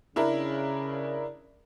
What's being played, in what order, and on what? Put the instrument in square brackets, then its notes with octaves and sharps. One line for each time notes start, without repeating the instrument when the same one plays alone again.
[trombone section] C#3 [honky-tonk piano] D4 E4 A#4